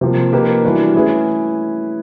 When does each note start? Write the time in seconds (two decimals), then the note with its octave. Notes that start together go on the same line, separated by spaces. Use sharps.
0.01 C3 F3 A#3
0.32 F3 A#3 D#4 G4 B4
0.64 E3 G3 B3 D4 F#4
0.95 A3 C#4 E4 G#4 B4